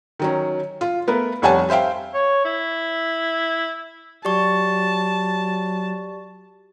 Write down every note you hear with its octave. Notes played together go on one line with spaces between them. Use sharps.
D#3 F#3 C#4
F4
A3 B3 A#4 B4
F1 G3 C#5 F#5 G#5 A5
G4 C5 E5 F5 G5
C#5
E4
F#3 G4 D5 A5 C#6